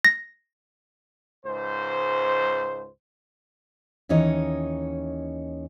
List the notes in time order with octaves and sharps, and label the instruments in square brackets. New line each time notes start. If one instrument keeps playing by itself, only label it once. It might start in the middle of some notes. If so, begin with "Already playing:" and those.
[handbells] A#6
[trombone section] C#2 G#2 C5
[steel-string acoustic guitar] D#2 E3 C#4 D#4 C#5 D#5